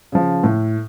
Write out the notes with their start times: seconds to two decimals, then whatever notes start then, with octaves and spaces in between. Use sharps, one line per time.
0.12 C#3 F3
0.44 A2